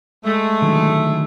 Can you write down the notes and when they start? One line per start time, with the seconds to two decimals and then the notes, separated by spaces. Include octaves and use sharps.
0.24 G#3 A3
0.62 D3 D#3 F#3